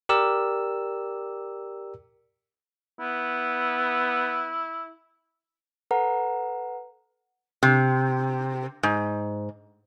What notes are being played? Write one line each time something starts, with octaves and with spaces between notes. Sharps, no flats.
G4 A#4 D5 E6
B3 E4
A4 B4 F#5 A#5
C3
G#2